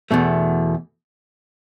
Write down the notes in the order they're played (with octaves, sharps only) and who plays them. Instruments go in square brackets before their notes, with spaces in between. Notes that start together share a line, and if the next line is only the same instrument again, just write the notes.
[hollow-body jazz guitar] E2 B2 A3